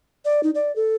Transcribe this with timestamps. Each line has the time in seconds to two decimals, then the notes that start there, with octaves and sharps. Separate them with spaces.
0.25 D5
0.43 D#4
0.55 D5
0.76 A4